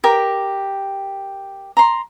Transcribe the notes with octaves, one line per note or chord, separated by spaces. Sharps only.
G4 A#4
A#5 C6